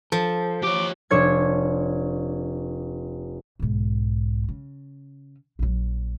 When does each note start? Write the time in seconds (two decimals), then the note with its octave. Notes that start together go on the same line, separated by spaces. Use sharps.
0.12 F3 A4
0.63 G4 C#5 D6
1.10 F1 D4 C#5 G#6
3.59 B1 G#2
4.49 C#3
5.59 A#1 F#3